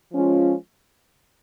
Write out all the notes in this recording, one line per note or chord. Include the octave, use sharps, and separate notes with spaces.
F3 G#3 C#4 F4